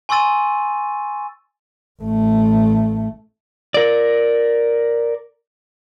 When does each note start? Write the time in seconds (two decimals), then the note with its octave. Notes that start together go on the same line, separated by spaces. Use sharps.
0.09 G#5 C6 C#6 E6 A6 D#7
2.02 A1 A3
3.74 A#4 D5